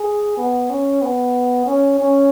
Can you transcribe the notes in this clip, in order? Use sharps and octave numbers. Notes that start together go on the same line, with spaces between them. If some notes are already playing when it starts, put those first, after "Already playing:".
Already playing: G#4
B3
C#4
B3
C#4
C#4